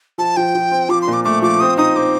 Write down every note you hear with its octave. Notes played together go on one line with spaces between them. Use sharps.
F3 A5
F3 G5
F3
C4
F3 D6
C6
A#2
D6
A3 D6
F3 D6
C4 D#6
D#4 D#6
C4 D6